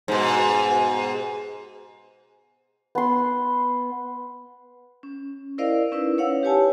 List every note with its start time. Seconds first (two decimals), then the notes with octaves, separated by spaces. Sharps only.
0.08 G#2 B2
2.95 B3 C6
5.03 C#4
5.58 E4 A#4 C5 D5 D#5 F5
5.92 C#4 D#4 E4 B4
6.18 C#5 F5 F#5 E6
6.43 G4 B4 C#5 G#5 A5